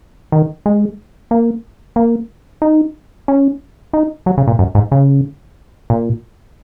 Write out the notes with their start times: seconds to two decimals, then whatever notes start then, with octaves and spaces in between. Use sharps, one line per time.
0.32 D#3
0.66 G#3
1.31 A#3
1.96 A#3
2.62 D#4
3.28 C#4
3.93 D#4
4.26 F#3
4.38 C#3
4.47 A#2
4.59 F#2
4.75 G#2
4.91 C#3
5.90 A#2